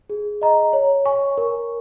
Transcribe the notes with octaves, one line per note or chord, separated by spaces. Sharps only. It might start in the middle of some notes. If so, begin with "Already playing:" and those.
G#4
D#5 A#5
C#5
G#5 C#6
A#4